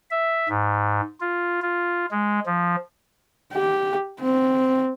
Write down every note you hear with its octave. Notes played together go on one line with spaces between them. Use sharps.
E5
G#2
F4
F4
G#3
F3
G4
C4